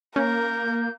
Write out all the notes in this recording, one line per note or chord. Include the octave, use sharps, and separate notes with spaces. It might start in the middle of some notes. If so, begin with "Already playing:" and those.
A#3 C#4 A#4 G6